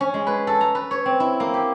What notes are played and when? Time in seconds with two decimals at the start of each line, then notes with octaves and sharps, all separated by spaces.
0.01 C#4
0.14 G#3
0.27 B4
0.47 A4
0.61 A#5
0.75 B4
0.91 C#5
1.06 C4
1.20 E4
1.40 A#3
1.54 G4